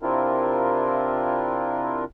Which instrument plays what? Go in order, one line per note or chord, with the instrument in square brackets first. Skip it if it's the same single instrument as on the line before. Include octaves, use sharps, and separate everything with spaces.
[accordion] C3 C4 D4 E4 F4 A#4